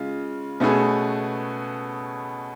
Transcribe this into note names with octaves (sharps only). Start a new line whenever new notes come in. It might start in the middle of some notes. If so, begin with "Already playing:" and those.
Already playing: C#3 G#3 F4
B2 A3 C#4 G#4 B4